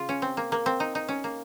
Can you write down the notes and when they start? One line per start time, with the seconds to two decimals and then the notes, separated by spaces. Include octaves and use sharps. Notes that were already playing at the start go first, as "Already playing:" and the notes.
Already playing: C#3 F4
0.09 C#4
0.22 C4
0.37 A#3
0.52 A#3
0.66 C4
0.80 D#4
0.95 D#4
1.08 C#4
1.24 A#3